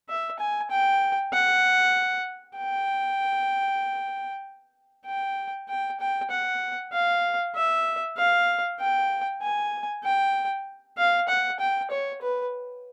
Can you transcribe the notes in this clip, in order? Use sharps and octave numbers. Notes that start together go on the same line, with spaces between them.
E5
G#5
G5
F#5
G5
G5
G5
G5
F#5
F5
E5
F5
G5
G#5
G5
F5
F#5
G5
C#5
B4